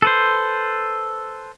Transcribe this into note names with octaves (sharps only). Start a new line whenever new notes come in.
A4 B4 C5